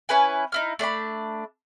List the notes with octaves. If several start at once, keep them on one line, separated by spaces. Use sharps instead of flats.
C#4 E4 B4 G#5
D#4 E4 F6
A3 D4 D5 B5